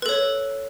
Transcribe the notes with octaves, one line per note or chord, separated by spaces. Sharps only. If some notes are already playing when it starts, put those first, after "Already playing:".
A4 B4 C#5